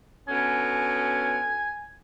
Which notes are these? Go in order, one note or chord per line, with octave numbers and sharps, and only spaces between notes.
B2 D3 C#4 G#5